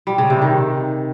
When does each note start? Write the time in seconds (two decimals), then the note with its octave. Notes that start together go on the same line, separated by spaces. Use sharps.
0.07 G3
0.18 C#3
0.30 C3
0.42 D#3